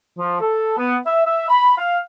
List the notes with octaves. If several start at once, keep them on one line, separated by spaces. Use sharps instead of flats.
F3
A4
B3
E5
E5
B5
F5